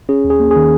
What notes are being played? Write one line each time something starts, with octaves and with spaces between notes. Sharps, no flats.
C#4 G#4
D#2
G#4
A#3
G#4
D#3